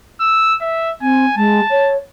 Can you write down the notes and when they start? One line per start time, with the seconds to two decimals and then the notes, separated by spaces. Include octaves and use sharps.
0.20 E6
0.61 E5
1.01 C4 G#5
1.36 G#3 A5
1.70 C#5